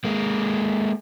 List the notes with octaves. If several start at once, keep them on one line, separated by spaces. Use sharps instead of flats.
G#3 A#3